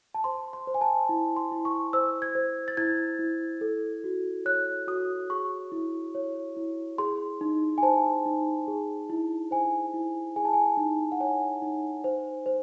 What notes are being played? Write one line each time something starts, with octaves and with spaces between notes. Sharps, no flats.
A5
C5 C6
C6
C5
G#5
A5
E4
C6
E4
C#6
C5 E6
G#6
C5
A6
E4 G#6
E4
A4
F#4
C#5 F#6
F#4 D#6
G#4 C#6
E4
C#5
E4
G#4 C6
D#4
G#5
C5 A5
D#4
G#4
E4
C5 G#5
E4
G#4 G#5
A5
G#5
D#4
F#5
C#5 G#5
D#4
C5
C5